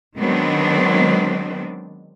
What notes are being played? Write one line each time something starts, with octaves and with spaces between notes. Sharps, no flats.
D#3 F#3 G#3 B3 C4 D4